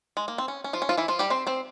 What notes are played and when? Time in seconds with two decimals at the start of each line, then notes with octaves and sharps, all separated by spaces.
0.17 G#3
0.28 A#3
0.38 C4
0.48 C#4
0.64 C#4
0.73 F3 F4
0.82 C#4
0.89 F3 F4
0.98 E3 E4
1.08 F3 F4
1.19 G3 G4
1.30 C4 C5
1.47 C4 C5